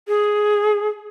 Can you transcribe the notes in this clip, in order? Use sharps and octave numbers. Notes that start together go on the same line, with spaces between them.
G#4